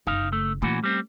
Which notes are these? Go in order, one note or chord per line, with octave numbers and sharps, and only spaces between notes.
F#1 C#3 D#4 F5
A3
A#2 E3 A3 C#4 F#4
G3 C4